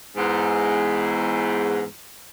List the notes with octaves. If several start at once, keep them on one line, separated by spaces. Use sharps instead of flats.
E2 G#2